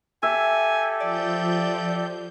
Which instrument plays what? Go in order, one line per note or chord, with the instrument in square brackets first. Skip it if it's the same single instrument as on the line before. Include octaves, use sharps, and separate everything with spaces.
[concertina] G4 A4 [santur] E5 [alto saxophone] G#5
[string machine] F3 G6 [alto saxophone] D5